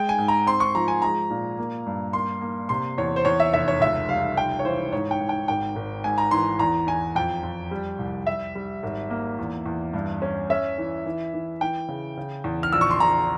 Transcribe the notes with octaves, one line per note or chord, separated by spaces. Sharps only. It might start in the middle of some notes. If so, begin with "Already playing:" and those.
Already playing: G#3 G5
G#5
G#2
A#5
C4 C6
C#6
F3 A#5
G#5
G#3 A#5
A#2
A#3
G2
A#3 C6
A#3
C3 C6
E2 C#5
C5
E2 C#5
E5
F1 E5
C#5
C#2 E5
G3 F5
F1 G5
C#5
E3 C5
G#2 C#5
G5
G#2
G5
G#1 G5
G#1
G#2 G#5
A#5
E3 C6
E2 A#5
E2 G#5
F2 G5
F2
G3
C2
G3 E5
G3
G#1
A#3
E2
E2
G2
C#4
C#4 E5
E3
E3
E3
E3 G5
C#3
C#3
E2
F6
A#1 E6
C#6
C6
A#1 A#5